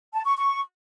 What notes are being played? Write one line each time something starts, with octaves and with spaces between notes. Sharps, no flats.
A5
C#6
C#6